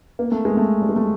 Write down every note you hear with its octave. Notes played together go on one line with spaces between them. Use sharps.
A#3
A3
G#3
A3
G3
G#3
A3